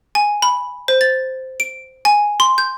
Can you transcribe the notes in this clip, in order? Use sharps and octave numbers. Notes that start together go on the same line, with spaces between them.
G#5
B5
C5
A6
D7
G#5
C6
G6